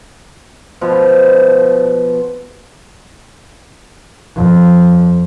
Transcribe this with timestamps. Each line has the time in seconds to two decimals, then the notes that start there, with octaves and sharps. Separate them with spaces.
0.81 B2 F3
4.36 F2